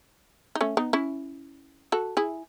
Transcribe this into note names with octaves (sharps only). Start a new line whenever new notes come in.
D#4
A3 C#4
B3 D#4
C#4 E4
F#4 A4
E4 G#4